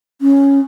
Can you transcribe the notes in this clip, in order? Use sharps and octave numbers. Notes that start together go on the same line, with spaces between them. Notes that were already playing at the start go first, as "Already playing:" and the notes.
C#4